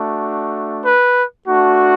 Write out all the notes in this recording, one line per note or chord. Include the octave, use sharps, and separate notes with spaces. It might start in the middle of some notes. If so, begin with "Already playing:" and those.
Already playing: A3 D4 F#4
B4
A3 D4 F#4